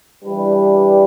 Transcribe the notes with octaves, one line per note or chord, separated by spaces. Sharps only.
E3 G3 D4 G4 B4